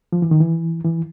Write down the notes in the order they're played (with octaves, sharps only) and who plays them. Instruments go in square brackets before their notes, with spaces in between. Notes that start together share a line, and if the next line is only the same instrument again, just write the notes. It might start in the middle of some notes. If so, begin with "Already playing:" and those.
[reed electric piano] F3
E3
D#3
E3
E3